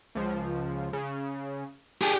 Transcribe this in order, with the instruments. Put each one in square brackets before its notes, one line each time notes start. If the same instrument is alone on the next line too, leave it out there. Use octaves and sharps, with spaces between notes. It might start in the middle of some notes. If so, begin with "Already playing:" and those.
[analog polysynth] C#2 F3
C#3
[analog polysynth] D4 [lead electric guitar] G4 G#4